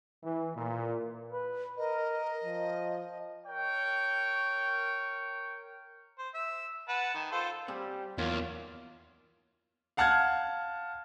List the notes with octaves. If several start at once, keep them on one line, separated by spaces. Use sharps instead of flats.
E3
A#2
B4
A#4 D#5
F3
A#4 C#5 G5
C5
E5
B4 F#5 A5
D#3
F4 A4 C5
G3 C4 G#4
E2 D#3 F#3 A#3 F4
F5 F#5 A5 F6 F#6 G#6